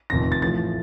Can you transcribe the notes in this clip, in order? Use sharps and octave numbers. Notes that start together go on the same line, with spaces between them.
F1 F2 D#3 A#6
A6
A1 A2 F3 A6